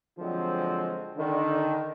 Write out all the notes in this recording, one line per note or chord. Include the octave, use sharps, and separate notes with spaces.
D3 F3 F#3 G#3 C4
D3 D#3